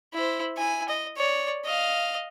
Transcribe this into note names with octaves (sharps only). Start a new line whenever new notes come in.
E4 C5
E4 G#5
D#5
C#5 D5
D#5 F5